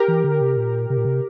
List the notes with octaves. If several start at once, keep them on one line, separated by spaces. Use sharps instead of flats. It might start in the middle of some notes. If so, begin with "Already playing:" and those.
Already playing: G4 A#4
E3
D3
C3
A#2
C3
A#2
C3